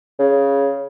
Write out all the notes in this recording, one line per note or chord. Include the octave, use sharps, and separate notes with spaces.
C#3